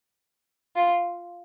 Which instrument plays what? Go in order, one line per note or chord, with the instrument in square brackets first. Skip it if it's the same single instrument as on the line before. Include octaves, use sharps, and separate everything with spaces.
[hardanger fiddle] F4